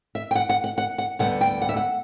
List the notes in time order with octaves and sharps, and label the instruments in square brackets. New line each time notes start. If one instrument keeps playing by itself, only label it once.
[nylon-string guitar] E5
G5
F#5
F#5
F#5
F#5
F#5
D2 D3 G3 B3 F#5
G5
F#5
E5
F#5